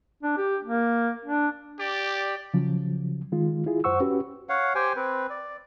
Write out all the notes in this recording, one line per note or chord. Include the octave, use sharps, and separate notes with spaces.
D4
G4
A#3
D4
G4 D5
C#3 F3 F#3
D#3 G#3 F4
E4 F4 G#4
F#2 C5 F#5 C#6 E6
C#4 F#4 G4 B4
C#5 F5 F#5
G4 C5 G5 G#5
C4 B4
D5